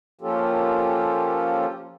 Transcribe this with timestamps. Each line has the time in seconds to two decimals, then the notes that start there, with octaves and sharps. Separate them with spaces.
0.21 F3 A#3 C#4 F4 G4 A4